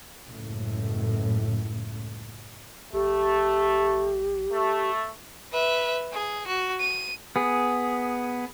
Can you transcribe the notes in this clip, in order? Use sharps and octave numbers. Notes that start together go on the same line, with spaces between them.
F#1 C#2 A2
A#1 A3 G4
A3
B4 E5
G#4
F#4
D#7
B3 G#4